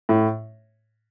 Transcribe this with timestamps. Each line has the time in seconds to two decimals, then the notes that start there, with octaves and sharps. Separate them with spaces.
0.09 A2